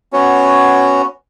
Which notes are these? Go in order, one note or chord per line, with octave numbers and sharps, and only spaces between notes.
B3 C#4 F#4 C#5